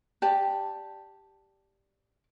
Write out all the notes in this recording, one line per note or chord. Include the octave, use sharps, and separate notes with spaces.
G4 D5 A5